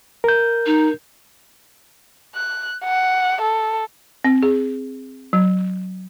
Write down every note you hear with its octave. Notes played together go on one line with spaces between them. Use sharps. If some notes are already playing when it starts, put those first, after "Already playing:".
A#4 G6
D#4
F#6
F#5
A4
C4
G#4
F#3